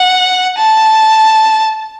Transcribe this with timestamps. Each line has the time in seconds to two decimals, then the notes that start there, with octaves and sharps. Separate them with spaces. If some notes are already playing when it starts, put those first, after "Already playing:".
Already playing: F#5
0.58 A5